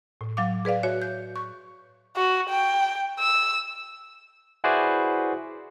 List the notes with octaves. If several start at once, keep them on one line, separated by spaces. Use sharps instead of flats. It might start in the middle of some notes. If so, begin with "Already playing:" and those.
A2
F#3 F5 D6
G#4 B4 D5 F5
F#4 C#5 E5
G6
C#6
F#4
G5
E6
E4 F#4 G#4 B4 C5 D5